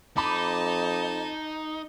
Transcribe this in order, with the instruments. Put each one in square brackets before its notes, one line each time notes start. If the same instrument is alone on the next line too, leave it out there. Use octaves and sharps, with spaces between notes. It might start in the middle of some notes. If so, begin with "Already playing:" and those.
[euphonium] F2 [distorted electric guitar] D#4 [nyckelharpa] A5 [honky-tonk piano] B5 D6